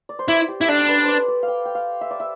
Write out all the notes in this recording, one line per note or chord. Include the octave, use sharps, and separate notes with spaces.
D5
C5
E4 D5
G4
E4
D4 A4
B4
C5 D5
D5
F5 G5
G5
F5
E5
D5
E5